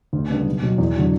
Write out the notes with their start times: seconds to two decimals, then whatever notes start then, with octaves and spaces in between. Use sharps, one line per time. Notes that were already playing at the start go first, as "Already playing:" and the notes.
0.13 D2
0.30 C#3 G3 B3 D4
0.46 B1
0.62 B2 F#3
0.78 E2
0.95 D3 F#3